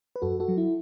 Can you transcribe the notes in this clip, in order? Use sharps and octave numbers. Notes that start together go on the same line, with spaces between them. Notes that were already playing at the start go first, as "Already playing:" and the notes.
B4
F#2 F#4 A4
F#4 A4
F#3
E4